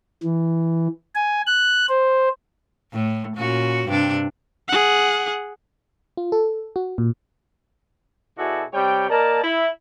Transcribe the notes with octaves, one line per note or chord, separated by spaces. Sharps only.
E3
G#5
F#6
C5
A2
A#2 C#4 F#4
G2 C3 D4
G#4 F#5
F4
A4
F#4
A#2
B2 E4 F#4 G#4 A4 D5
C3 G3 C#5 G5
A#3 A#4 D5 D#5 A5
E4 B5